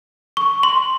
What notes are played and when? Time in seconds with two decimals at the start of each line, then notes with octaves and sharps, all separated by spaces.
0.37 C#6
0.63 C6